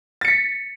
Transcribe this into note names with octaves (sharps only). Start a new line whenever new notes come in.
A6 B6 C#7